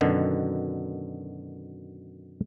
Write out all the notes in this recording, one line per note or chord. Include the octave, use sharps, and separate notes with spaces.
F#2 B2 D3 D#3